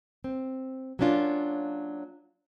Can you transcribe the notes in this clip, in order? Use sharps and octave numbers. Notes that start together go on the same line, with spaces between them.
C4
F#3 A#3 C#4 D4 F4